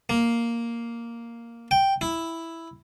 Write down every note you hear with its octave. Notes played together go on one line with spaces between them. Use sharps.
A#3
G5
E4